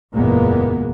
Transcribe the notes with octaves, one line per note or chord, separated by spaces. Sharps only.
F#1 E2 A#2 G#3 A#3 B3